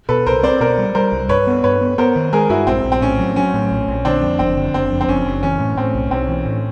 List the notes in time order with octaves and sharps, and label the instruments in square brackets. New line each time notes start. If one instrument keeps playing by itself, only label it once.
[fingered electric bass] B2 [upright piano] A4 B4
[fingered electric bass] C2 [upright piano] A#4 C5
[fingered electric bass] C4 [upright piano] C5 D5
[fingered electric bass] B2 [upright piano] A#4 C5
[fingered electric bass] G3
[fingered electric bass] G3 [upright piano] A#4 C5
[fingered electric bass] C2
[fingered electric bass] G2 [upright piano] B4 C#5
[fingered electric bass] B3
[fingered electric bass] G2 [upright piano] B4 C#5
[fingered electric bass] B3
[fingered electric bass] B3 [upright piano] A#4 C5
[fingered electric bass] D#3
[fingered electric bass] G#3 [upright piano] G#4 A#4
[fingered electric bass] G2 [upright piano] E4 F#4
[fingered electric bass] A#1 [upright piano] C4
[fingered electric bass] A#1
[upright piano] C4
[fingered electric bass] A2 [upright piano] C#4
[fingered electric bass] F#3
[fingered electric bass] F#3 [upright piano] C#4
[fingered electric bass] A2
A#1
A#1
[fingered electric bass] D3 [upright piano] C4 D4
[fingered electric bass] F2
[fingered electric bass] F#1 [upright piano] C4
[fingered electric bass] D3
[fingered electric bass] F#1 [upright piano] C4
[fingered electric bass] F2
[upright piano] C4
[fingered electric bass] F#1 [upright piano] C#4
[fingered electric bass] F#1
[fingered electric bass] E3 [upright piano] C#4
[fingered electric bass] A2
[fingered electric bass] A2 [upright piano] C4
[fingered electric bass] B1
[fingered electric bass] B1 [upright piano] C4
[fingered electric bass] E3
A2